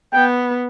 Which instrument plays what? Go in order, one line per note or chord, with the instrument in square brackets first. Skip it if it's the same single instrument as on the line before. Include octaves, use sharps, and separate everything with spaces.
[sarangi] B3 [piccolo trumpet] G5